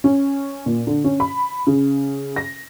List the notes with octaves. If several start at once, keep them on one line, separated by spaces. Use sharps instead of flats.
C#4
A#2
D3
C#4
B5
C#3
A#6